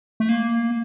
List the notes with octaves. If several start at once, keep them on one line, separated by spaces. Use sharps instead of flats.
A3
A#3